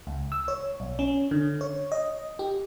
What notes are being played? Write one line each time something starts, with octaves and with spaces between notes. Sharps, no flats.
C#2
E6
C#5
B1
C#4
D3
C#5
D#5
G4